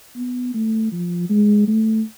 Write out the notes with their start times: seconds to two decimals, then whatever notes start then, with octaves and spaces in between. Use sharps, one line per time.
0.16 B3
0.54 A3
0.92 F3
1.30 G#3
1.68 A3